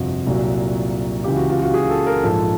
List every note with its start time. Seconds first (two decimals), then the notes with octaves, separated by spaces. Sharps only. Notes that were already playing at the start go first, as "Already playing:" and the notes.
Already playing: G1 F2 C3 F3 F#4
0.26 C2 A#2 F#3
1.24 C#2 C#3 E3 G4
1.36 F#4
1.49 F4
1.62 F#4
1.74 G#4
1.90 A4
2.07 A#4
2.23 A#1 G#2 F3 A4